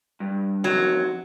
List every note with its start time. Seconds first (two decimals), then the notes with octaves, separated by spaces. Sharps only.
0.20 G2
0.64 F2 D#3 F#3